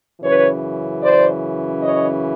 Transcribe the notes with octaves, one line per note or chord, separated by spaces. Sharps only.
F#2 C#3 E3 B4 C#5
C5 D5
C#5 D#5